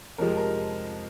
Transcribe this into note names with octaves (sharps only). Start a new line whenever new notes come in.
F2 C3 F3 G#3 A#4
A#4